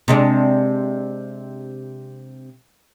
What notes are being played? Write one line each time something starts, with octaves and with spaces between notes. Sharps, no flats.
C3 G#3 D4